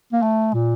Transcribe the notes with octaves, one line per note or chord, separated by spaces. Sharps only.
A#3
A3
A#2